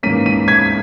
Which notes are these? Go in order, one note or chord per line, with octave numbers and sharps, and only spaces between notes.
G#2 E3 A#3 C#4 B6 D#7
B6 D#7
G#6 B6